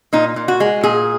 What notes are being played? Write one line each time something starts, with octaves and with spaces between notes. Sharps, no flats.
A#2 D#4
A#2
F#4
G#3
A#2 G#4